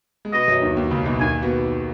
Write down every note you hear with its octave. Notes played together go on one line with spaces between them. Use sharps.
G#3
B2 B3 D#5
F#2 F#3
D#2 D#3
D#2 D#3
C#2 C#3
B1 B2
D#2 D#3 G#5
B2 B3